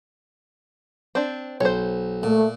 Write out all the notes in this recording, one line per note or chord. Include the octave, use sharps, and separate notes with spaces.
C4 D4
B1 C5 C#5
A#2 A3